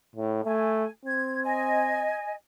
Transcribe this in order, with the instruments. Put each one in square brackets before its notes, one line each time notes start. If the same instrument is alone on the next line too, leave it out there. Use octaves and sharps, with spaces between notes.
[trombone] A2
[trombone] A3 [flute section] G#5
[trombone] C4 [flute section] G#6
[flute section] D#5 G#5